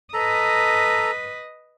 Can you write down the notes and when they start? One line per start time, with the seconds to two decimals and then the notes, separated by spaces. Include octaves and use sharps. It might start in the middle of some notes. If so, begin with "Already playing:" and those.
0.14 A4 B4 D#5 A#5